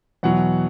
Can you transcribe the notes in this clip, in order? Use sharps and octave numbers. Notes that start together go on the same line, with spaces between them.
E2 B2 F#3 F#5